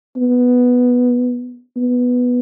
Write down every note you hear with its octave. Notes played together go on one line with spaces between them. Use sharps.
B3
B3